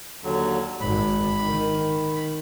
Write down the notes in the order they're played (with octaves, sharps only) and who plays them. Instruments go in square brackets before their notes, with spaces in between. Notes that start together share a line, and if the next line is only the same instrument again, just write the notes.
[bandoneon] D#2 D3 F#3
[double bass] G#1 [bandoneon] B5
[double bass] D#3